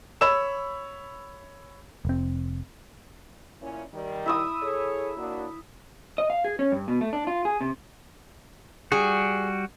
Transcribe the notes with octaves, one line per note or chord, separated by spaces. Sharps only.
C#5 B5 E6 E7
F1 C4
A#2 C#4 E4
D#3 G3
E4 E5 D#6
G#4 A4 C#5
F#3 A#3 D4
D#5
F5
G#4
C#4
G2
B2
A3
D4
F4
G#4
C3
G3 F#4 G#4